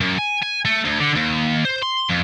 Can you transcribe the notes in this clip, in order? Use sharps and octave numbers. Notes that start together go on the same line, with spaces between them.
F#2
G#5
G#5
A3
D2
D3
D#2
C5
C6
F2